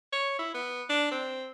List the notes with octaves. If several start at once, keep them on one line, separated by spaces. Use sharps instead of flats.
C#5
E4
B3
D4
C4